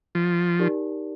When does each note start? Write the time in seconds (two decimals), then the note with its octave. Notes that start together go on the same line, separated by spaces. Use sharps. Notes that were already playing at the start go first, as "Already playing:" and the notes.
0.15 F3
0.59 D#4 G4 A#4 D5 A5